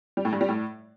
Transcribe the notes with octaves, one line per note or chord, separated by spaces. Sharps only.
G3
A2
G2
G3
A2